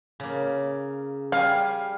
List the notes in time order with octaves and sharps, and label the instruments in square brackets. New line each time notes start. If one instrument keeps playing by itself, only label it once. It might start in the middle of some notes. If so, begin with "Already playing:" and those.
[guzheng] C#3 A#3
[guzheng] G3 G#5 [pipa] F5